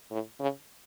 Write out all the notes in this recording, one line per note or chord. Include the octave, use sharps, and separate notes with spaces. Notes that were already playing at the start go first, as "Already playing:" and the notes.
A2
C#3